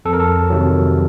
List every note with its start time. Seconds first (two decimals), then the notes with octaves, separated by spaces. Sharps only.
0.05 F2 A4
0.13 A#4
0.20 A4
0.50 C3 D#3 F#3